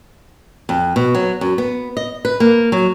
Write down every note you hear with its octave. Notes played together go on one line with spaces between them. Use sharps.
F2
B2
F#3
F#2
B3
D#5
B4
A#3
F#3